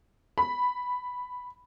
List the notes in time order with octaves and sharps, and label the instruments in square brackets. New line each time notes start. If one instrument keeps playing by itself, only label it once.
[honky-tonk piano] B5